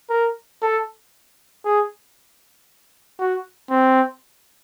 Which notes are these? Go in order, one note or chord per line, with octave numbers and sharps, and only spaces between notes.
A#4
A4
G#4
F#4
C4